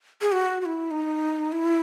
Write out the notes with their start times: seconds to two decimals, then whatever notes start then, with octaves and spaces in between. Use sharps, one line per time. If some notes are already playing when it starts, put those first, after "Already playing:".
0.22 G#4
0.32 F#4
0.61 F#4
0.66 E4
0.91 D#4
1.52 E4